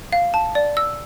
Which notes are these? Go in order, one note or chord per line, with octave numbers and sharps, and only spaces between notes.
F5
A5
D5
E6